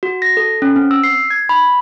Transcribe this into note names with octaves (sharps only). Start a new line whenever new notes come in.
F#4
A#6
A4
C#4
C4
E6
C7
G#6
B5